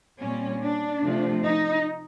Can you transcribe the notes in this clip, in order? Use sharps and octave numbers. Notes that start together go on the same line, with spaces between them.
A#2 G3 C4 C#4
D4
C3 F3 A3
D#4